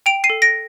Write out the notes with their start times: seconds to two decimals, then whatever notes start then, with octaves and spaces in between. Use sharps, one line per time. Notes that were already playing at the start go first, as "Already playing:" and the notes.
0.06 G5 D7 F7
0.24 C7 D#7
0.30 A4
0.42 A#6 D7